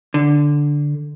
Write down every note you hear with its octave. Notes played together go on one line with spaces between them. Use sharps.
D3